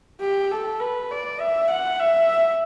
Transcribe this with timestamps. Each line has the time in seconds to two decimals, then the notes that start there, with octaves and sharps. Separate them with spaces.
0.21 G4
0.51 A4
0.80 B4
1.11 D5
1.40 E5
1.70 F#5
2.00 E5